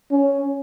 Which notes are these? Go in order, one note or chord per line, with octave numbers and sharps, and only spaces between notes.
C#4